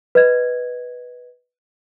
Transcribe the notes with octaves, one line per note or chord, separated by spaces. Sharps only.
B4 D#5 G#6